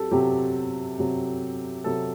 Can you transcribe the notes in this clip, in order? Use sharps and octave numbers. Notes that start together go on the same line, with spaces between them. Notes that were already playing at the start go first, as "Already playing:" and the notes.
Already playing: F#3 C4 G4 A4
C3 F#3 C4 G4
C3 F#3 C4
C3 F#3 C4 A4